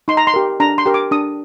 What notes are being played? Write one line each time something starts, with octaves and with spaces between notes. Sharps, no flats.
D#4 C6
A#5
C6
G4 A#4
D4 A#5
C6
G4 A#4
D6
D4 D#6